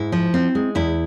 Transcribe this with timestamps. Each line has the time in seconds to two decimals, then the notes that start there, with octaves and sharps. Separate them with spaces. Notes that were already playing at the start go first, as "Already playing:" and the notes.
Already playing: G#2 E4
0.12 F3
0.34 C4
0.55 G#3
0.75 E2 E4